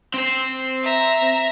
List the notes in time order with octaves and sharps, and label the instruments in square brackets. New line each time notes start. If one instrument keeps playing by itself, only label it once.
[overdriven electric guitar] C4 C5
[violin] E5 A#5